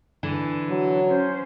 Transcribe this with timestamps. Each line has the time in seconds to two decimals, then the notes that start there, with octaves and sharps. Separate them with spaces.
0.23 D3 E3
0.70 F#3
1.08 C#4 C5